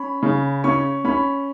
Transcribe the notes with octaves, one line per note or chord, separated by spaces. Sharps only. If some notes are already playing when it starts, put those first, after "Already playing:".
Already playing: C#4 B5
C#3
C#4 C#6
C#4 B5